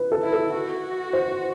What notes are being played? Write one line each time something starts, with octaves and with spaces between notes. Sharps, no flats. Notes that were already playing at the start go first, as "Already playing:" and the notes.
Already playing: B4
A4
E4
A4
F#4
C5